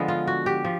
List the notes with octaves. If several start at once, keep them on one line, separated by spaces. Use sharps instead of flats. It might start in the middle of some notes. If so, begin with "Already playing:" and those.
Already playing: D3 F3 G#3 B3
F4
F#4
G4
F3